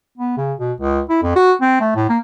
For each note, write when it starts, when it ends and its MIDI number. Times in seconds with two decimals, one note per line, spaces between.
0.18 0.35 59
0.37 0.53 49
0.60 0.73 47
0.80 1.01 37
1.09 1.20 64
1.23 1.33 41
1.36 1.53 66
1.62 1.79 60
1.81 1.92 57
1.96 2.05 45
2.09 2.19 58